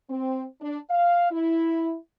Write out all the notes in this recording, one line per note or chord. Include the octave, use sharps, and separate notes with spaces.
C4
D4
F5
E4